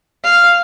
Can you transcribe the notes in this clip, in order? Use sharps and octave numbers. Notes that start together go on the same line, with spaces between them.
F5